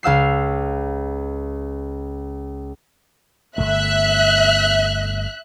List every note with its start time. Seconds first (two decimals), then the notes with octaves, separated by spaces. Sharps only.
0.03 C#2 F5 E6 C7
3.58 G1 E2 A3 E5 F#6